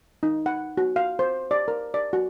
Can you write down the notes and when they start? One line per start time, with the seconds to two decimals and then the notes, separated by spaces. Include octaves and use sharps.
0.23 D#4
0.46 F#5
0.77 F#4
0.96 F5
1.19 C5
1.51 D5
1.68 A#4
1.94 D5
2.13 F#4